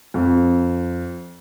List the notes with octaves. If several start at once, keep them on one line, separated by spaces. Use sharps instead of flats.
F2